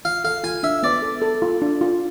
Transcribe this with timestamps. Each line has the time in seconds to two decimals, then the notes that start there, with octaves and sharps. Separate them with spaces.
0.05 F4 F5
0.24 A4 F5
0.44 F4 G#5
0.63 D4 E5
0.83 B3 D5
1.02 A4
1.22 A4
1.42 F4
1.62 D4
1.81 F4